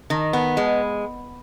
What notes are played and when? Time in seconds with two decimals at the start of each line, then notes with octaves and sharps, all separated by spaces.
0.10 D#3
0.33 B3
0.57 G#3